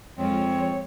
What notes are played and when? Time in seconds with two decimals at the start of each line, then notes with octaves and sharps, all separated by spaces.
0.18 F2 F3 G#3 C4 F4 C#5